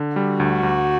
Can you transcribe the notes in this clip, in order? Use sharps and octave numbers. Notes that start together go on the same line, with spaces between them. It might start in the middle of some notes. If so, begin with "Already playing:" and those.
Already playing: D3
G3 F#4
D2
D2